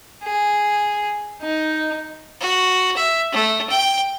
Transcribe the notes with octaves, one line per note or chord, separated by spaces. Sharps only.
G#4
D#4
F#4
E5
A3
G5